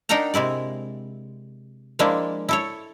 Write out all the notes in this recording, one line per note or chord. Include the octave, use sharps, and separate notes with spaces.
D4 D#4 A#4 F#5 G5 A#5
C3 G#3 E4 D5
F3 G#3 A#3 D4 E4
E4 A4 C#5